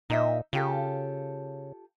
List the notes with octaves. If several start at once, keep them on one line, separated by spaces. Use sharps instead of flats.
A#2 D#4 D#5 E5
C#3 F4 G4 A4